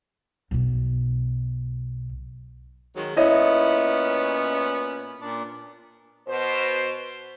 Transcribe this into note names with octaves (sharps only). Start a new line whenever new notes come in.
B1 B2
D#3 F#3 G#3
A#2 B3 C#4 E4 C#5 D#5
A#2 D4
B2 C5